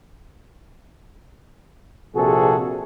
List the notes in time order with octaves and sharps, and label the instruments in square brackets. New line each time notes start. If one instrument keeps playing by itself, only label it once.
[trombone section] A#1 C3 F#4 G#4 A4